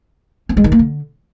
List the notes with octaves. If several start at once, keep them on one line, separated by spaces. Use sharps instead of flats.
C4
G#3
D#3
A#3
D3